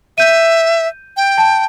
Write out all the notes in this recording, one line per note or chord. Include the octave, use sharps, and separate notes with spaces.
E5 G6 D#7
G5
A5